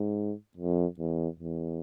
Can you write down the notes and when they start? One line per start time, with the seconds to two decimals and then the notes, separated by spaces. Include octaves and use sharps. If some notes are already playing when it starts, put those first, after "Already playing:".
Already playing: G#2
0.57 F2
0.99 E2
1.40 E2